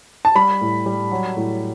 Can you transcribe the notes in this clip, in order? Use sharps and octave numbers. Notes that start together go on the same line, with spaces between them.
A5
G3 B5
A2
G3
F#3
A2